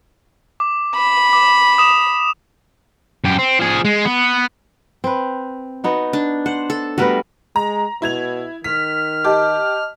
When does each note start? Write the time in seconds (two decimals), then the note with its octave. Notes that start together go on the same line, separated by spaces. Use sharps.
0.60 D6
0.95 B5
1.33 D6
1.78 D#6 E7
3.24 F#2 G4
3.39 C4
3.59 F3 G#4
3.85 G#3
4.05 B3
5.04 C4 B4
5.84 B3 D#4 F#4
6.13 D4
6.46 C5 F#5
6.70 A4
6.98 G3 A3 B3 F#4 A#4 B4
7.56 G#3 A#5
8.02 B2 E4 G#6 F7
8.64 D#3 F6 B6
9.24 G4 D#5 A5 D6